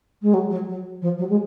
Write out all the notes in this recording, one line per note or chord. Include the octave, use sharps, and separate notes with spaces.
G#3
F#3
F#3
F#3
F3
F#3
G#3